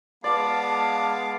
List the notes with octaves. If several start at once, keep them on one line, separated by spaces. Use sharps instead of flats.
G#3 B3 D5 F5 A5 D6